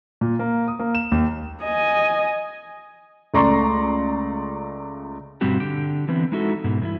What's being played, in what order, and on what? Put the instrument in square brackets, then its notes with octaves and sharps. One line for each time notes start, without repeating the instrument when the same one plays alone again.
[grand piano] A#2
A#3
D#6
A#3
E7
D#2
[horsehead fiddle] D#5 G#5
[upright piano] C#2 A3 D5 A#5 C6 C#6
[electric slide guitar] G2 B2 G3 C4 F#4 G4
D3 G4 G5
D3 E3 B3 C4
G#3 D#4 E4 F#4 A4
G#2 B2
G2 E3 E4